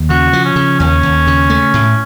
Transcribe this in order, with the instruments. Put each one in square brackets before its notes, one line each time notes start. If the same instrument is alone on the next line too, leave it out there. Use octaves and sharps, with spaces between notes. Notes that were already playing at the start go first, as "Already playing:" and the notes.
Already playing: [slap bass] D#2
[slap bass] C#3 [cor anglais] F#4
[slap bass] F3
[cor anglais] C#4
[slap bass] C#3
[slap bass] D#2 [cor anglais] C#4
[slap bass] D#2
C#3
A3
A2